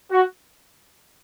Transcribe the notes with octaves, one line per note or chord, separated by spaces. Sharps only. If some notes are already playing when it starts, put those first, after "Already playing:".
F#4